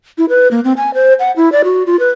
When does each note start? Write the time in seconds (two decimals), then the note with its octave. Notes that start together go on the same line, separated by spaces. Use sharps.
0.18 E4
0.29 B4
0.51 A#3
0.64 C4
0.77 G#5
0.94 C5
1.19 F#5
1.36 E4
1.52 D5
1.64 F#4
1.86 F4
2.00 B4